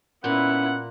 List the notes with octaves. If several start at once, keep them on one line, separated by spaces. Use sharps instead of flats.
A#2 B3 C#4 E4 F#5